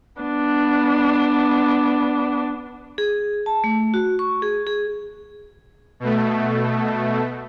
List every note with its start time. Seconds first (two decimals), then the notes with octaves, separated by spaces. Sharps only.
0.21 B3 D4
2.98 G#4
3.46 A5
3.64 A3
3.94 F#4
4.19 C#6
4.42 G#4
4.67 G#4
6.00 B2 A3